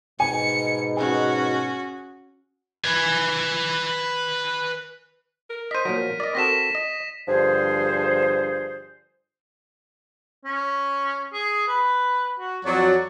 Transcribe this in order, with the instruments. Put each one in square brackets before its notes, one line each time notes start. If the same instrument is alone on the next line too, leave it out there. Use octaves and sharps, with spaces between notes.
[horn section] G#2 B2 [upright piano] G#5 [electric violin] C#7
[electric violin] C#4 F#4 [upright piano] G#4
[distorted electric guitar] B4 G#5
[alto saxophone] A#4
[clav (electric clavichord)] C5 D#5 [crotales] B6 D#7
[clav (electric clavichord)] A#2 F3 F#3 [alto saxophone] A#4
[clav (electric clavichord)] D5 D#5
[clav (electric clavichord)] C4 F#4 A4 [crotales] A#6 B6 E7
[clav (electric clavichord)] D#5
[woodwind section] G2 D3 F3 G#4 C5
[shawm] C#4
G#4
B4
F#4
[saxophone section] F2 F#3 [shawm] D5